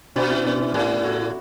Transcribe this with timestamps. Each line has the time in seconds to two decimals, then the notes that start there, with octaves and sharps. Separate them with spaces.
0.16 B2 D4 F#4
0.30 C#4 E4
0.45 B3 D4
0.60 C#4 E4
0.74 A2 E4 G4
1.04 F#4 A4